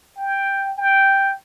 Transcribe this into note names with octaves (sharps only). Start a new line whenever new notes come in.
G5
G5